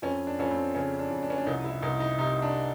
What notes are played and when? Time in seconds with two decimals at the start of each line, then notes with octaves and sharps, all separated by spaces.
0.02 F2 C#4
0.27 D4
0.39 F2 C#4
0.51 C4
0.75 C#3 C#4
0.99 D4
1.11 F2
1.23 D4
1.30 C#4
1.38 D4
1.47 C2 D#4
1.64 E4
1.82 C2 D#4
2.00 D#4
2.18 C3 D#4
2.42 D4